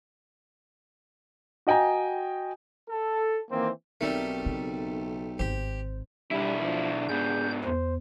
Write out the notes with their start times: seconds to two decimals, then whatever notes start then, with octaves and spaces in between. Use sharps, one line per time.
1.67 F#4 D#5 G5 G#5 A#5
2.90 A4
3.51 D#3 E3 A#3 C4
4.01 B1 G3 A3 C4 D#4 A#4
4.46 C#3
5.39 G#1 G4 C5
6.31 B1 G3 D4 E4
6.62 F3 D4
7.09 G#2 B3 G#4 G6
7.64 E2 C5